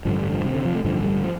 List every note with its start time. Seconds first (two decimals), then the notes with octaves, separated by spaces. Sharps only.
0.05 A1 G2 D3 F3
0.19 G3
0.32 F3
0.44 D2 C3 F3
0.55 D3
0.65 F3
0.75 A3
0.85 A1 G2 D3 F3
1.04 G3
1.24 F3